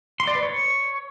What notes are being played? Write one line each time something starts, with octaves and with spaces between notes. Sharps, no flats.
C6
D5
B4
C#5